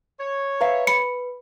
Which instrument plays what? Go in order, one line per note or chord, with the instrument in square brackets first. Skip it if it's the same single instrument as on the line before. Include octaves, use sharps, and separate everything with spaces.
[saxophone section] C#5
[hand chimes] B4 [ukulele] E5 F5 A#5
[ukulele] B5 [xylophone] C#7